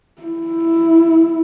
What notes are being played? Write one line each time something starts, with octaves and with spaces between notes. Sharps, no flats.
E4